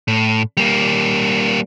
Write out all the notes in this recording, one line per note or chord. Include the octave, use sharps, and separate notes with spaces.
A2
G3 A#3